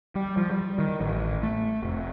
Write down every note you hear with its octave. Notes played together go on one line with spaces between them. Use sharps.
G3
F3
G3
D#3
A1
A3
F1